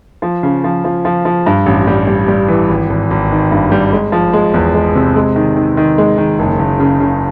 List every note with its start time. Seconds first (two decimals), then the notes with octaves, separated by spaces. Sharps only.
0.22 F3
0.43 C#3
0.64 F3
0.84 F3
1.05 F3
1.25 F3
1.46 G2
1.66 A1
1.87 G3
2.07 G3
2.28 G3
2.48 E3
2.69 G#1
2.90 G#1
3.11 G#1
3.31 D#3
3.52 G2
3.71 G3
3.93 G#3
4.12 F3
4.33 G#3
4.54 E2
4.74 G#3
4.95 C3
5.16 G#3
5.36 D#3
5.56 D#3
5.77 D#3
5.98 G#3
6.18 D#3
6.39 F#1
6.59 F#1
6.80 C#3
7.00 C#3